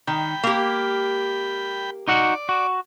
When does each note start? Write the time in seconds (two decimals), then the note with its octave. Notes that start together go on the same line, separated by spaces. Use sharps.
0.07 D#3 G5 B5
0.44 A#3 G4
2.08 D#4 F#4 D5 F#5
2.49 F#4